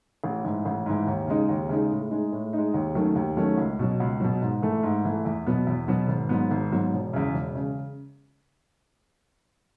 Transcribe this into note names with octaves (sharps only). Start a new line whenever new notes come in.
A1
G#2 E3
A1
G#2 E3
D#2
C#3 G#3 D#4
D#2
C#3 G#3 D#4
A2
G#3 D#4
A2
G#3 D#4
D#2
D#3 F#3 A3 C#4
D#2
D#3 F#3 A3 C#4
C#2
B2 F#3
C#2
B2 F#3
G#2
E3 A3
G#2
E3 A3
E2
B2 F#3 B3
E2
B2 F#3 B3
G#1
G#2 F#3 B3
G#1
G#2 F#3 B3
E1
E2 C#3
E1
C#3